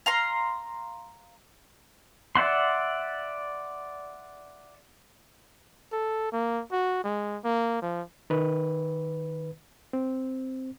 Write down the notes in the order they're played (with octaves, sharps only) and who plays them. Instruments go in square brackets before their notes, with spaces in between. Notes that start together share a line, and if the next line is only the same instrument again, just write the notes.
[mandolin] F5 A#5 C6
[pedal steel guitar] D5 E5 F#5 C6
[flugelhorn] A4
A#3
F#4
G#3
A#3
F3
[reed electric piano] D#3 B4
C4